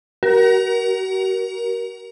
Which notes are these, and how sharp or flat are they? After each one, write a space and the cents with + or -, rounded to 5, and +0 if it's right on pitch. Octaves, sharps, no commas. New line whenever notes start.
F#4 +40 A#4 +20